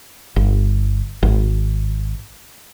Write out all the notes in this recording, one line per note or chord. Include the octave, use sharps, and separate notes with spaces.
G1
G#1